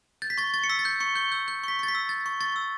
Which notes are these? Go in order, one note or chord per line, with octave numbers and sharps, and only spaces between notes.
G6 A6
B6
C#6 A6
C#6 A6
C#7
E6 B6
A6
G6
C#6 C#7
C#6 G6
E6 G6
G6
C#6 B6
C#6 A6
B6
E6
G6 A6
C#6
C#6 A6
E6